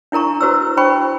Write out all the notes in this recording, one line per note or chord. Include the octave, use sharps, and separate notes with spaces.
D4 E4 A#4 A#5 C#6
E4 F#4 B4 C5 E6
D4 E4 C5 G5 B5 C#6